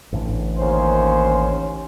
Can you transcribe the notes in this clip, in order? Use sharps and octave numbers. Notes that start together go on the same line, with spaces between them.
A1 A2 D3
D#2 C#4 C5